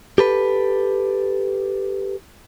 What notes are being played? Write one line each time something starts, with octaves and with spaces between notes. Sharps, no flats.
G4 A4 B4